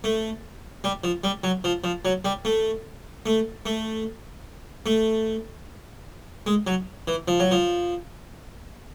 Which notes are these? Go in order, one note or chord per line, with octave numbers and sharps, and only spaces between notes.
A3
G3
F3
G3
F#3
F3
F3
F#3
G3
A3
A3
A3
A3
G#3
F#3
E3
F3
F#3
F3